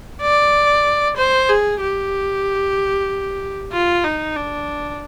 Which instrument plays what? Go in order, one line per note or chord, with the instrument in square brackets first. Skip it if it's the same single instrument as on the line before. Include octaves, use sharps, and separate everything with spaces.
[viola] D5
C5
G#4
G4
F4
D#4
D4